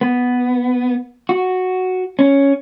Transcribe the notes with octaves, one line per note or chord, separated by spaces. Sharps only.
B3
F#4
C#4